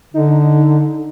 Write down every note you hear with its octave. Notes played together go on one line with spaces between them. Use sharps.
D3 D#4